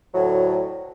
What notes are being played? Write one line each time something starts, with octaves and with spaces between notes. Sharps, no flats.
D2 A2 F#3